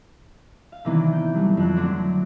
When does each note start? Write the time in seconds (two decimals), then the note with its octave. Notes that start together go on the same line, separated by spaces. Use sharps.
0.72 F5
0.85 C3 D#3 E3 A#3 B3 D4
1.13 G6
1.34 F#3 G3 A3
1.57 F2 F#6
1.76 D3 F#3 A3 C4 D4 F#4